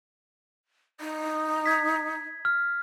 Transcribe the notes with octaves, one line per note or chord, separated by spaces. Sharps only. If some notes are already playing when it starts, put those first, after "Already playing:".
D#4
G#6 B6
F6